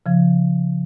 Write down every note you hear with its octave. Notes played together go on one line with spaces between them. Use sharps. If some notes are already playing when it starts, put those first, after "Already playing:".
C#3 F3